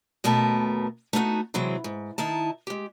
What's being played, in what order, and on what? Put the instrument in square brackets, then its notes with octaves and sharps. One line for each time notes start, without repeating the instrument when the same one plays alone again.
[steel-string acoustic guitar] D#2 B2 A3 A#4 B4 A5
A3 B3 D#4 F4 F#4
C3 E3 F#3 G#3 C4
G#2
D#3 D#4 E4 A5
G#3 G4